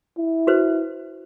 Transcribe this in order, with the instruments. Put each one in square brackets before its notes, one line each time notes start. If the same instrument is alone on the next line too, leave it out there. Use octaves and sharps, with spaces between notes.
[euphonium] E4
[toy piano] F#4 B4 C5